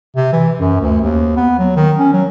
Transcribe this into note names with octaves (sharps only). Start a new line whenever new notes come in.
C3
E3
F#2
D2
D#2
B3
F#3
D#3
C#4
F#3